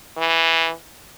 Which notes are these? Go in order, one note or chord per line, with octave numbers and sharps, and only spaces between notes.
E3